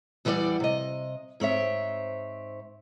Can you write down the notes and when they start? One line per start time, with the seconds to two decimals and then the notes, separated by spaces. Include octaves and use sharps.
0.25 E2 E3 G3 A4 D5 F#5
0.60 C3 D#5
1.40 G#2 C4 C#5 E5